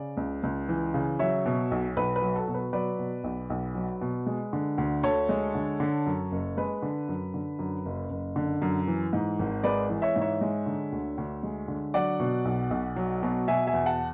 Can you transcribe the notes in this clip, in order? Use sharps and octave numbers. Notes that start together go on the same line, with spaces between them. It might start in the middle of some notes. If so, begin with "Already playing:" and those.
Already playing: C#3 D5
C#2
C#2
E3
C#3
F#3 C#5 E5
B2
B1
B1 B4
B4
F#3
A4
B2
B4
F#3 B4 D5
B2
B1
B1
F#3
B2
G#3
D3
D2
D2 A4 C#5
G#3
D3
D3
F#2
F#1
G#3 B4
D3
F#2
D3
F#2
F#1
F#1
D3
F#2
E3
G#2
G#1
G#3 B4 D5
E3
C#5 E5
G#2
C#5 E5
G#3
D3
D2
D2
G#3
D3
F#3 D5 F#5
B2
B1
B1
F#3
B2
B2 E5 G#5
E5 G#5
E2
F#5 A5